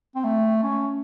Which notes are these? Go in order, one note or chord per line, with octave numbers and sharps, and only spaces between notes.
C4
A3
C#4